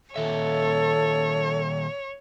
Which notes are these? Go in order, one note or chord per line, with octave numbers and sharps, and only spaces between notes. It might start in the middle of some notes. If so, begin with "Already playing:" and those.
A#2 D#3 A4 C#5 E5